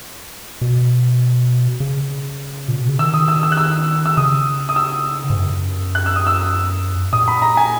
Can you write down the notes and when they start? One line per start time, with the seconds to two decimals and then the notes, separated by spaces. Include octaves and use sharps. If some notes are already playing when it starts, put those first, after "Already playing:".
0.61 B2
1.80 C#3
2.68 A#2
2.78 B2
2.89 C#3
2.99 D#3 E6
3.14 D#6
3.28 E6
3.43 E6
3.52 F#6
3.57 E6
4.06 E6
4.17 C#3 D#6
4.69 D#6
4.76 E6
5.30 G#2
5.36 F#2
5.95 F#6
6.06 E6
6.16 D#6
6.27 E6
7.13 A#2 D#6
7.28 B5
7.42 A#5
7.57 G#5